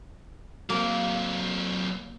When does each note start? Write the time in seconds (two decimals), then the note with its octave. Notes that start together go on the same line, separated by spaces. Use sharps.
0.70 F#3 A#3 C4